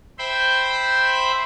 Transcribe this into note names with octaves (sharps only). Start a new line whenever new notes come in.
C5 E5 G5 B5 C6